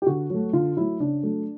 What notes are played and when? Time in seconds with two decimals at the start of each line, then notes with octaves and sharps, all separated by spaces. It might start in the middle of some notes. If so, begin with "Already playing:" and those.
0.02 G4
0.06 D3 F#4
0.30 F#3 A3
0.53 D3 F4
0.77 F#3 A3 E4
1.00 C#3 D4
1.23 F#3 A3